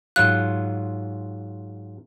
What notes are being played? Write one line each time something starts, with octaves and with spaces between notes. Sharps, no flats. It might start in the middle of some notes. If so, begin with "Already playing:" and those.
G#2 F#3 F4 F#6